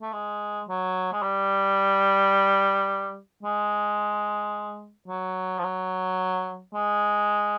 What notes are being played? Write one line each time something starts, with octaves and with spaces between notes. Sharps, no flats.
A3
G#3
F#3
G#3
G3
G#3
F#3
F3
F#3
G#3